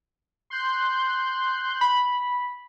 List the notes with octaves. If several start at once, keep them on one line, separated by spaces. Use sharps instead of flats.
C6 F#6 G6
B5